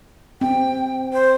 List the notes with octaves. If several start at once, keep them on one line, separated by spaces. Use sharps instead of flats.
C4 G5
C5